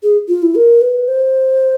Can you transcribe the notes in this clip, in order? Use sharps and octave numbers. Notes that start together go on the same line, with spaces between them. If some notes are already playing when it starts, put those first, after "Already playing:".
G#4
F4
E4
A#4
B4
C5